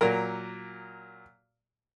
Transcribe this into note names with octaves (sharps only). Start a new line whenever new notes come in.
A#2 F#3 A#4